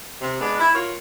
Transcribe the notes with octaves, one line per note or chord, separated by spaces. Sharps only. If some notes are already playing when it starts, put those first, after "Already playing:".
C3
G#3 B3 D4
E4
F4 F#4 A#4 C#5